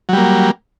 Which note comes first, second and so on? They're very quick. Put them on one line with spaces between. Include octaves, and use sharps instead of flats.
F#3 G3 A#3